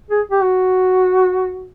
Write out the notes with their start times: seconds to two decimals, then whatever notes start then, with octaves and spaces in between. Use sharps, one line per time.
0.10 G#4
0.31 G4
0.42 F#4